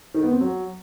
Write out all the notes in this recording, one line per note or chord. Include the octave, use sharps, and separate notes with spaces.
D#3
B3
C4
F#3